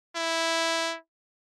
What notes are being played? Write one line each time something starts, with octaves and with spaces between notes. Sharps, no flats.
E4